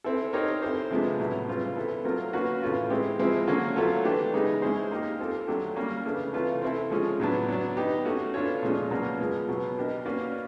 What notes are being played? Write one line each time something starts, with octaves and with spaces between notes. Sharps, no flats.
C4 E4 A4
C4 D#4 G4 A#4 C#5
C4 E4 A4 C5
C3 F3 G#3 B3 D4
A2 F#3 B3 E4
C#3 E3 G3 C4 F4
B3 E4 A4
F#3 A3 C4 F4 A#4
A#3 C#4 F#4 B4
A2 E3 A3 C#4 F4
G#3 C4 E4 G4
F3 G#3 C4 E4
D3 F#3 A#3 C#4
F#3 A3 C4 F4 A4
E3 A3 D4 G4
C#3 E3 G#3 B3 D#4
G#3 C#4 E4 G#4 C5
A#3 D#4 G4
C4 F4 A4
F#3 A3 D4 G4
G3 A#3 C#4
C#3 E3 A3 D4
C3 E3 A3 C#4 F4
C4 E4 A4
F3 G#3 C#4
A2 F#3 B3 D4
F#3 B3 D4
B3 D#4 G4
A3 C#4 F#4
B3 D4 F4 A4 C#5
A#2 F3 G#3 C#4
B2 F#3 A#3 C#4 F#4
F3 G#3 B3
B2 F#3 B3
B3 D4 G4 A#4 D#5
A#3 C#4 F#4 B4 D5